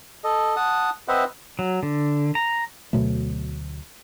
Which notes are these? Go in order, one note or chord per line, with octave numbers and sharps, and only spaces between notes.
A4 D#5
F#5 A5 D#6
C4 B4 C5 D#5 E5 F#5
F#3
D3
A#5
D2 B2 F#3 A3